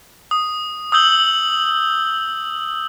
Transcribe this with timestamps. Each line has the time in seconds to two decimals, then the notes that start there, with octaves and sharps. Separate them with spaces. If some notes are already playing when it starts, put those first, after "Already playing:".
0.31 D#6
0.92 D#6 E6 G6 F#7 G7